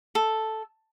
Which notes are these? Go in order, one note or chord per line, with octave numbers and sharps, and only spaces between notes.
A4